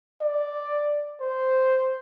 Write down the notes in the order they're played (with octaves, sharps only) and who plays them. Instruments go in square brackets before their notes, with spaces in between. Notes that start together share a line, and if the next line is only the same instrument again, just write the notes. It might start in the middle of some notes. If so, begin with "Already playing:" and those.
[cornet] D5
C5